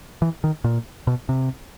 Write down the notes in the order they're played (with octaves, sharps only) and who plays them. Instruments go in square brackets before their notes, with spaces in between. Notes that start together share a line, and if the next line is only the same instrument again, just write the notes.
[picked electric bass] E3
D#3
A#2
B2
C3